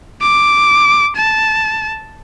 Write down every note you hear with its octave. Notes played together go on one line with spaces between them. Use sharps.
D6
A5